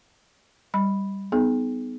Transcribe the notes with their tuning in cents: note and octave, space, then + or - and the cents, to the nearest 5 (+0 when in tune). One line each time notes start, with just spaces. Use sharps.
G3 +0 B5 +0
B3 +20 D#4 +0 G#4 +35